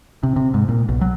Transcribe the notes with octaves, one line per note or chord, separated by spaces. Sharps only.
C3
C3
G#2
A#2
B1
F#3